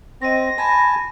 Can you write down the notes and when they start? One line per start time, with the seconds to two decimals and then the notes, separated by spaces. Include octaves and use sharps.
0.22 C4 D#5 C6 A#6
0.58 G#5 A5 B5